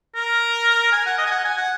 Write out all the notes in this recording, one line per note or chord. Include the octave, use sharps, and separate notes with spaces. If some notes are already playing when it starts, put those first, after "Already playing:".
A#4
G#5
F#5
D#5
G#5
F#5
G#5
F#5